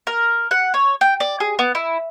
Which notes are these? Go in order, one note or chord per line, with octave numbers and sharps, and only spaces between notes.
A#4
F#5
C#5
G5
D5
G#4
B3
E4